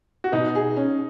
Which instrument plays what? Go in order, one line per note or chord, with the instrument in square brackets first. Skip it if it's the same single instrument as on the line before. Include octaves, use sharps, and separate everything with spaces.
[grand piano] F#4
[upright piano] B2 [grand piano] D#4
[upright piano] G#4
C#4